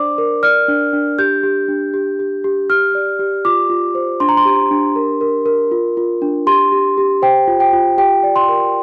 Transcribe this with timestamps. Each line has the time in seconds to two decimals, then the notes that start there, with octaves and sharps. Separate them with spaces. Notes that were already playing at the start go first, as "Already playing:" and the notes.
Already playing: D4 C5 D5 D6
0.18 A#4
0.43 D5 F6
0.68 D4
0.93 D4
1.19 G4 G6
1.43 G4
1.68 D4
1.94 G4
2.19 G4
2.44 G4
2.70 G4 F6
2.95 D5
3.19 G4
3.45 F4 D6
3.70 F4
3.95 C5
4.20 D4 C6
4.29 A#5
4.37 C6
4.45 G4
4.71 D4
4.96 A#4
5.21 A#4
5.46 A#4
5.71 F4
5.97 F4
6.22 D4
6.46 G4 C6
6.72 G4
6.98 G4
7.22 C5 G5
7.48 F4
7.60 G5
7.73 F4
7.98 G4 G5
8.23 D5
8.36 C6
8.49 A#4